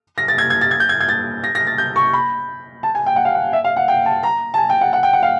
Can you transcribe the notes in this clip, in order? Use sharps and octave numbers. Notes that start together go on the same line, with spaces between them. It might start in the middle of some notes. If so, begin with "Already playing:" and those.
A#6
A6
G#6
G#6
A6
G#6
G6
G#6
G#6
A6
A#6
A#6
A6
G6
C#6
B5
A5
G#5
G5
F#5
F5
F#5
E5
F5
F#5
G5
A5
A#5
A5
G#5
G5
F#5
F#5
G5
F#5
F5